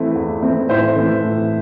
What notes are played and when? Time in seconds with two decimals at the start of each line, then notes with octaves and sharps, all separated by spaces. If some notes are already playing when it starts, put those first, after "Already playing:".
Already playing: E3 A3 C4 E4
0.15 E2
0.42 E3 A3 C4 E4
0.69 A2 C5 E5
0.95 E3 A3 C4
1.22 A2